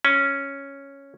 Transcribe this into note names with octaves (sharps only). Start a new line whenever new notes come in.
C#4